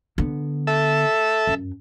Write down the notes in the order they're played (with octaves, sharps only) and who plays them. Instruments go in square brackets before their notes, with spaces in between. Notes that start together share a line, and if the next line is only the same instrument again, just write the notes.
[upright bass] D3 B3
[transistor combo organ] A4 E5
[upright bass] F#2